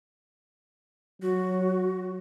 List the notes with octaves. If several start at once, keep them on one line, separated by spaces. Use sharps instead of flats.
F#3 F#4